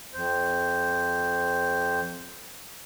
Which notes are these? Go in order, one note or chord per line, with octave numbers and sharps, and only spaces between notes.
F2 C5